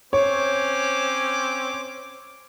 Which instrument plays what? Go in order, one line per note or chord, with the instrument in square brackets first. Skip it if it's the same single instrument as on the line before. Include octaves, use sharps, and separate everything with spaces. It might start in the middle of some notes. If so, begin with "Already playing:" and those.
[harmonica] C4 C#4 C5 [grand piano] C#5 [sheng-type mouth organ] D6